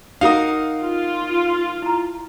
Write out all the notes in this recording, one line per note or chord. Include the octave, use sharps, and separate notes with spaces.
D#4 F#4 A#4 F5 D#6
F4
E4 A#5